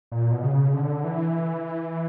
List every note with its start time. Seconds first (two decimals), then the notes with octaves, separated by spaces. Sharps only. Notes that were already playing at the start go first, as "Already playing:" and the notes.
0.12 A#2
0.32 B2
0.43 C#3
0.74 D3
1.04 E3